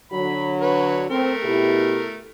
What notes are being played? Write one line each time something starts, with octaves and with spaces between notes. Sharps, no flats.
D3 F#3 B5
B4 C#5
A3 C4 A#4
B2 E4 G4